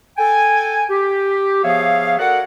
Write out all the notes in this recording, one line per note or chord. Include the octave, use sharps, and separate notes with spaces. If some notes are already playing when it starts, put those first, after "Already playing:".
A4 G5 G#5
G4
F3 B3 G#4 C#5 E5 F5
F#4 A4 A#4 D5 F#5